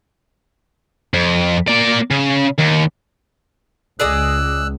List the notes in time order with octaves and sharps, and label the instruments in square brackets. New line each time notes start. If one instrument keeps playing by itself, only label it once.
[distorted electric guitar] F2
A#3 D5
C#3
D#2
[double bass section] C#2 [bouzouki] G#4 D5 D#5 [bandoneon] E6 F#6